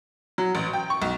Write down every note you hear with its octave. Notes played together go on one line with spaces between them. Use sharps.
F#3
A1
G5
C#6
B1